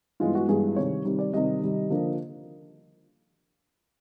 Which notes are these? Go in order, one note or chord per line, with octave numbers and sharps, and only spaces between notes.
G2 E3 G#3 B3 F4
F#4
G2 E3 G#3 B3 G#4
C3 D#3 G3 C#5
C3 D#3 G3
D5
C3 D#3 G3 D#5
C3 D#3 G3
D3 F3 A#3 D4